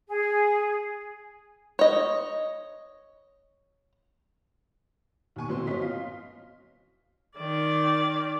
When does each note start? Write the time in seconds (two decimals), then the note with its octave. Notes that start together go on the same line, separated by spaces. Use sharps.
0.09 G#4
1.79 C#5 D#5
5.36 D#2 B2 G#5 C#6
5.48 G1 A2 F#3 B3 C4 C6
5.67 A#2 F#3 C#4 D#5 C6 B6
5.80 D#5 F5
7.37 D#3 D5